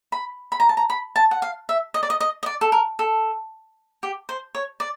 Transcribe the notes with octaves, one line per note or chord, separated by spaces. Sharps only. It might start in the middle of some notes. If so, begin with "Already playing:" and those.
B5
B5
A#5
A5
A#5
B5
A5
F#5
F5
E5
D#5
D5
D#5
D#5
D#5
D5
A4
A#4
A4
G4
C5
C#5
D5